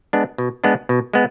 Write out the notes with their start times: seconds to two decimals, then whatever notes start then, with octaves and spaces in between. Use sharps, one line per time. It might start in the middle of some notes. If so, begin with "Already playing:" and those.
0.13 G#3 B3 D4
0.38 B2
0.64 G#3 B3 D4
0.89 B2
1.13 G#3 B3